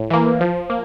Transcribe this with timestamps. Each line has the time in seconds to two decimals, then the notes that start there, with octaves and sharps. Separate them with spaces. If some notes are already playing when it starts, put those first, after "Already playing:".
Already playing: A2
0.10 E3 A#3
0.41 F3
0.70 A#3